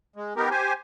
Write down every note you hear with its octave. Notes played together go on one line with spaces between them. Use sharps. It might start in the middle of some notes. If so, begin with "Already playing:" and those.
G#3
B3 D#4 G4 A#4
G4 C5 G#5